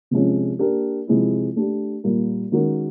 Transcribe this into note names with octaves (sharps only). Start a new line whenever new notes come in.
C3 F3 G#3 C#4
A#3 D4 G4 A#4
C3 F3 G#3 C4 E4
A3 D4 G4
A#2 G3 A#3
D#3 G#3 C#4 F#4 A#4